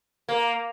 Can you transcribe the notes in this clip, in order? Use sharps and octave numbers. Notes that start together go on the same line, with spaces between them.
A#3